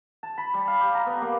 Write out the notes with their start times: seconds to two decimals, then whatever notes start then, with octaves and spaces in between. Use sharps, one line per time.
0.23 A5
0.38 B5
0.54 G3
0.68 F5
0.80 G4
0.95 A#5
1.06 B3
1.22 A#3